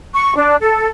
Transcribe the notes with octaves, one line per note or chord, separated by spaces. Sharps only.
C#6
D4
A4